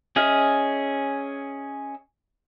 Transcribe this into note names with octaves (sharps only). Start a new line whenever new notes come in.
C#4 G#4 D#5 E5 F6